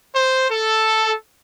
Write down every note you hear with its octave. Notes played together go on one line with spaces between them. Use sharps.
C5
A4